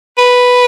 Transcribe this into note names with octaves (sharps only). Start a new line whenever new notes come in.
B4